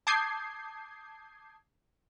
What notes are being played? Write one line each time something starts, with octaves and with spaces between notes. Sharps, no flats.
A5 D6 D#6 G6 G#6 C7